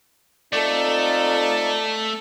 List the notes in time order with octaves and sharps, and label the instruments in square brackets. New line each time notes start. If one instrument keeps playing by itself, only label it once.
[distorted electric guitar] A3 [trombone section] C4 D#4 F4 [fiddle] A4 [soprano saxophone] D5